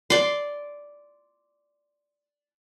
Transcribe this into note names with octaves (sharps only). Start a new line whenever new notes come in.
D5 C6